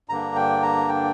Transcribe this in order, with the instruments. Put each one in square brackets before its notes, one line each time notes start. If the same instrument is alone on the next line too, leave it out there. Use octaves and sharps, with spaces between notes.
[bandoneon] G2 D3 A#3 D4 A#5
G5
A#5
G5